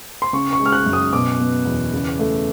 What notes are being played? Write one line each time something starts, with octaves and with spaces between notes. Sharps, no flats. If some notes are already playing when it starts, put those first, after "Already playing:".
C6
C#3 C#6
C#6
G#3
F6
F#6
F#2
D#6
B2 D6
B3
E2
C#3
A3